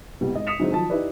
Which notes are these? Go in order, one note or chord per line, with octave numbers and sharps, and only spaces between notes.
C2 B2 G3
G#1 D#5
D#6 B6 C#7 E7 F7
D3 F#3 G#3 C4 D#4 E4
D#3 F3 F#3 A5
D#4 E4 G4 B4 D5